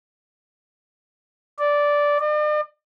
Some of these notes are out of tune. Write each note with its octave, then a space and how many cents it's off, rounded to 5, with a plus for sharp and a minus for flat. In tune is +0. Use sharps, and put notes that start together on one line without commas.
D5 -10
D5 +45